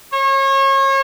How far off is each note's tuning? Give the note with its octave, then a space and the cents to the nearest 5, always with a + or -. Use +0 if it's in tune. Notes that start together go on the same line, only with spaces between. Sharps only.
C#5 -35